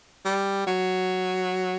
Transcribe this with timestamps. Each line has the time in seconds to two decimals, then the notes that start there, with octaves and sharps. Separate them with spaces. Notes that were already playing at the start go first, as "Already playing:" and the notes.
0.25 G3
0.67 F#3